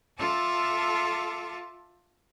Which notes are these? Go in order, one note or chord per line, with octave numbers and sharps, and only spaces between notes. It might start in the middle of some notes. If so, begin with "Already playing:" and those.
F4 A4 E5 A5 D6